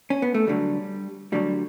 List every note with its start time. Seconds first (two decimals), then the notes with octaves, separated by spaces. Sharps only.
0.10 C#4
0.22 B3
0.34 A3
0.47 D2 D3 F#3 G3
1.32 D2 D3 F#3 G3